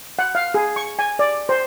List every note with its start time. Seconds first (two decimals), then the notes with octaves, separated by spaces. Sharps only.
0.19 F#5
0.35 F5
0.54 G#4
0.76 C#6
0.99 G#5
1.19 D5
1.49 C5